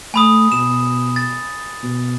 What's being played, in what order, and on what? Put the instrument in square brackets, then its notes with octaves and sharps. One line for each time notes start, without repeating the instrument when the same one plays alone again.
[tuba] A3 [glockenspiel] G#5 B5 D#6
[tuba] B2 [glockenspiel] E7
[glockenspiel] A6
[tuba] B2